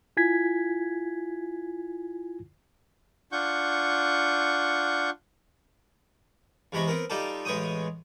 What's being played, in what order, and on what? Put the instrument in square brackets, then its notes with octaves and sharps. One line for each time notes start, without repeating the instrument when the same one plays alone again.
[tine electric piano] E4 F4 G#5 G#6 B6
[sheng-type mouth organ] D4 F4 F#5 C#6 G6
[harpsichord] E2 C3 G#3 A#5 B5 C#6
B3 C4 A#4
G3 D#4 F4 G4 A4
A1 G#3 B3 C#5 G5 D#6